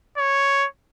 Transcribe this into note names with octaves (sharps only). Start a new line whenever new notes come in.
C#5